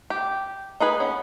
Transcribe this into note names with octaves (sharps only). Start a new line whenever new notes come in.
G4
D#4 G#4 B4 G#5
B3 C#4